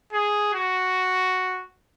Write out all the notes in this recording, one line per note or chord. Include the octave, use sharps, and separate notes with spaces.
G#4
F#4